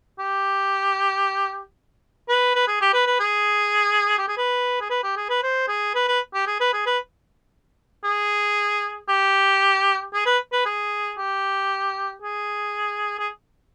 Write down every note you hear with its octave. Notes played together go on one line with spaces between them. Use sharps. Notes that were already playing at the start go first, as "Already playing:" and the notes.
G4
B4
B4
G#4
G4
B4
B4
G#4
G4
G#4
B4
G#4
B4
G4
G#4
B4
C5
G#4
B4
B4
G4
G#4
B4
G#4
B4
G#4
G4
G#4
B4
B4
G#4
G4
G#4
G#4